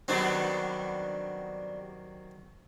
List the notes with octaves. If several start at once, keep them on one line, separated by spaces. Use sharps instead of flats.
D#3 F#3 G3 B3 C4 D4